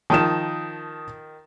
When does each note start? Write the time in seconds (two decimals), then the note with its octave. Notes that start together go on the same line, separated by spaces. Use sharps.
0.10 D#3 F3 A5 D#6 E7